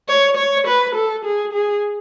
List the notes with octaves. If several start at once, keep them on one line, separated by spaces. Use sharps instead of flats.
C#5
C#5
B4
A4
G#4
G#4